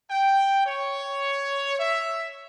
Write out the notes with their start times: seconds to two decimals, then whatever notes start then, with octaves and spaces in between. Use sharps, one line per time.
0.10 G5
0.66 C#5
1.79 E5